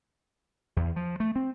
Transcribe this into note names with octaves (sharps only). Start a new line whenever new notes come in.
E2
F3
A3
C4